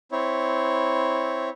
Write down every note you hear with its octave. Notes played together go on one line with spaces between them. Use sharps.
C4 E4 C#5